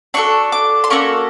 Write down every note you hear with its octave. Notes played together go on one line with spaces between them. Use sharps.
D4 F#4 A4 C#6
D6
C6
A#3 C#4 F#4 A4 C#6